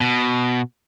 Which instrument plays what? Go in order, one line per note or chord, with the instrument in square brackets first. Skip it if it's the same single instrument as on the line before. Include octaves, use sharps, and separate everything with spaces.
[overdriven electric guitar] B2